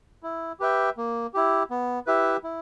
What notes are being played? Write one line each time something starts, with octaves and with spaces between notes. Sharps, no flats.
E4
G4 B4 E5 G5
A#3
E4 G4
B3
E4 G4 B4 E5
E4